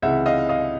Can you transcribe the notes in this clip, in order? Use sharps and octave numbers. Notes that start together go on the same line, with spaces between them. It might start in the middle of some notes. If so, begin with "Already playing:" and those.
C#2 C3 E3 E5 F#5
D#5 F5
D#5 F5